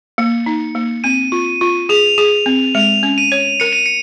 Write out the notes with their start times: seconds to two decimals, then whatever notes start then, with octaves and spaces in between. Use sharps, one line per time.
0.18 A#3 C#7
0.46 D#4
0.75 A#3
1.04 C4 D#7
1.32 F4
1.61 F4
1.89 G#4 F7
2.18 G#4
2.46 C4
2.75 G#3 F7
3.03 C#4
3.18 D#7
3.32 C#5
3.60 A#4 C#7
3.73 D#7
3.86 C#7